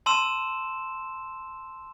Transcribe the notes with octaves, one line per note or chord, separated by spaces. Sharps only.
A5 C6 E6 E7